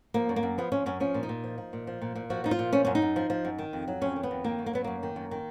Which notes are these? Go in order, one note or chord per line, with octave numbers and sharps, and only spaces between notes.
F3 A#3
F#2
A#3
F#2
F3 B3
F3 C#4
F#2 C#4
F3 C#4
A#2
D#4
A#2
F3
F3
A#2
F3
A#2
A#2
F3 F#4
F3 D#4
F4
A#2
F3 C#4
F#2 C#4
D#4
F#2
F3
F3
F#2
D#3
F2
F#3
F2 C#4
D#3
B3
F2
D#3 A#3
F#2
A#3
F#3 B3
F#2 A#3
D#3
F#2
D#3